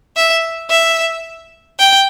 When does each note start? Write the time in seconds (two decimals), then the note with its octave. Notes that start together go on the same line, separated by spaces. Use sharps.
0.16 E5
0.70 E5
1.79 G5